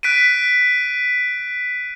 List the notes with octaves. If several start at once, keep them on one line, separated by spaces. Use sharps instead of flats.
F#6 B6 D7 D#7